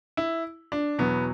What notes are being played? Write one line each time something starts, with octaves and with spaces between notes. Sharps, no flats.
E4
D4
E2 B2 F#3 B3